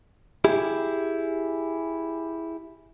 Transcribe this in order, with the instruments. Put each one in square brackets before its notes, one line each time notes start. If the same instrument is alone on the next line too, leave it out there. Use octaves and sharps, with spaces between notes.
[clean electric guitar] E4 G4 G#4